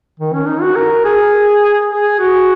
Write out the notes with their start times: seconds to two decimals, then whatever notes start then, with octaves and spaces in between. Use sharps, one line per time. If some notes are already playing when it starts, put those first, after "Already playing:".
0.20 D#3
0.33 C#4
0.48 D#4
0.62 F#4
0.76 A#4
1.05 G#4
1.90 G#4
2.19 F#4